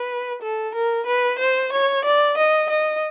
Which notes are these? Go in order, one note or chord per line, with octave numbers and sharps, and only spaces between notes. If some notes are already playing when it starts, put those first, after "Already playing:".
Already playing: B4
A4
A#4
B4
C5
C#5
D5
D#5
D#5